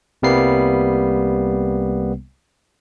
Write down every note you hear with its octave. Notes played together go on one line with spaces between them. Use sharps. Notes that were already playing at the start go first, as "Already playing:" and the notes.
C2 C3 G3 A#3 B3 C7